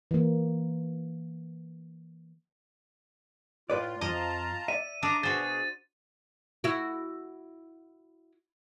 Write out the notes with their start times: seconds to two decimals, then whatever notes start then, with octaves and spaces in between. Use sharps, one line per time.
0.11 E3 A#3
3.70 A2 F4 B4 D5
4.01 F2 F3 F4 D#5 A5 A#5
4.68 D5 E5 D#7
5.03 D4 A#5 D6 D#6
5.23 B2 F#4 G#4 C5 A6
6.64 E4 F#4